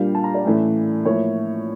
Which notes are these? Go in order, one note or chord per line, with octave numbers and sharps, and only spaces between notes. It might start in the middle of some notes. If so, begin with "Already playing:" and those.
Already playing: A#2 G3 A#3 D4 F5
A5
A#5
D5
A2 E3 A3 C#4
A2 F3 A#3 C#5